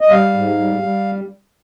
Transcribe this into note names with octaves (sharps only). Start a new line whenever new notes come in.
D#5
G3 F5
G#2
G3
G3